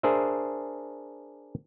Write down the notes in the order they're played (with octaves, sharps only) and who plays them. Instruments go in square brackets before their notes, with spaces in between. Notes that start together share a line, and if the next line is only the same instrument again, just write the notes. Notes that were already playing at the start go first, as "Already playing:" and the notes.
[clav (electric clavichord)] D4 G#4 A#4 C5 E5